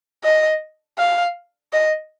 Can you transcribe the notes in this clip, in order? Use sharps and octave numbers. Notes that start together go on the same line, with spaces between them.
D#5
F5
D#5